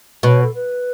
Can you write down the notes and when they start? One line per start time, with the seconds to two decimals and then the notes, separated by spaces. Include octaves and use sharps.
0.23 B2 C#5 D#5
0.43 A4
0.54 B4